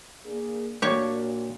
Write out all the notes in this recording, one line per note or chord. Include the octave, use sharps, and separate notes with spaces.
A#3 D4 G#4
A#2 A#3 D4 F#4 G4 C#5